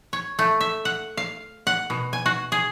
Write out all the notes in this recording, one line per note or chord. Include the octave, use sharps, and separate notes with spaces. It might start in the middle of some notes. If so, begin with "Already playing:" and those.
C#5
A3
E5
F#5
F5
F#5
B2
G#5
F#4
G#4